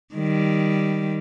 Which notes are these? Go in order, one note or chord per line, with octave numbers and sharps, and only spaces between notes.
D#3 G3